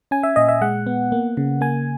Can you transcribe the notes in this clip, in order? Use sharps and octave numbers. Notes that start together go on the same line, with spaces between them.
C#4 G#5
E5
A#2 D#5
E5
G#3 F#5
B3
A#3
C#3
A#3 G#5